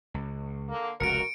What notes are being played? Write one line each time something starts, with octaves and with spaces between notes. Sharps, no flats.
C#2
D3 A#3
F1 C#2 F#4 A#4 C#7 D7